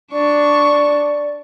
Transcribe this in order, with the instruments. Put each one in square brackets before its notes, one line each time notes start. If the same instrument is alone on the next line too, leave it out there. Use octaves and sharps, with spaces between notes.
[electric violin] D4 C#6 [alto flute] D5